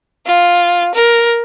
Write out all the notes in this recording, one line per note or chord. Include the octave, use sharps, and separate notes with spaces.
F4
A#4